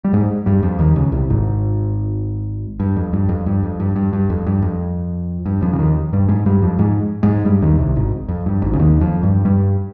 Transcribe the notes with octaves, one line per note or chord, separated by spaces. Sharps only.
G3
G#2 G#3
G2 G3
F2 F3
D#2 D#3
C#2 C#3
C2 C3
G#1 G#2
G2
F2
G2
F2
G2
F2
G2
G2
G2
F2
G2
F2
G2
F2 F3
C#3
D#2 D#3
G2 G3
G#2 G#3
G2 G3
F2 F3
G#2 G#3
G#2 G#3
G2 G3
D#2 D#3
C2 C3
G#1 G#2
F2
G2
G#1 G#2
C#3
D#2 D#3
F2 F3
G2 G3
G2 G3